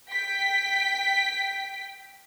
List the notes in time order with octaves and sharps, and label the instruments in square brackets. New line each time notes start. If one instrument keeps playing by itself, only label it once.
[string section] G5 B6